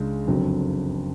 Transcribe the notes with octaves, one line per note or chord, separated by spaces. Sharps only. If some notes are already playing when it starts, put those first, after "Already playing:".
Already playing: C#2 C#3 G#3 D4
F#1 F2 D3 F#3